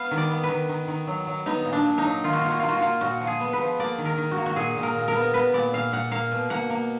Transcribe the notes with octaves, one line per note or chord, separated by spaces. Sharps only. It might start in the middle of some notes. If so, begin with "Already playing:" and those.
Already playing: B3 F5
D#3
D5
B3
B4
D#3
D#3
D#3
F#3
F#3
B3 D#4
A#2
D4
A#2
D#4
F#3
D#3 F4
F#4
A#3 F4
F#4
A#3 F4
F#4
A#3 F4
A#2 F#4
F3
G#4
B3
B4
F3
A#3 D5
D#3
A#4
D#3
F#4
A#3
F#4
A#2 G#4
A#2
A#4
A#2
A#4
B3
B3 B4
A#2 D5
A#2 F5
A#2 F#5
A#3 F5
B2
A#3 F#5
A#3